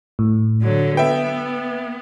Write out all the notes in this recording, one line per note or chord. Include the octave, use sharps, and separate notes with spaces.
A2
D3 F#3
B3 B4 E5 G5